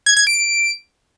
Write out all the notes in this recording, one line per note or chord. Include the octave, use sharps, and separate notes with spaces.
G#6
G#6
D7